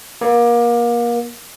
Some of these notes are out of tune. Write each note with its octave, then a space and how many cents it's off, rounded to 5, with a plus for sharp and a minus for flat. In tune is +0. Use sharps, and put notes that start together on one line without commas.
A#3 +30